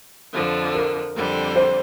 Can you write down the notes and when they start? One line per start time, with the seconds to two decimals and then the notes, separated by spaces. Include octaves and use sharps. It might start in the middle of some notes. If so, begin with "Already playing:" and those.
0.33 F2 D3 F3
0.74 A#4
1.16 F2 D3 G3 C4
1.56 C5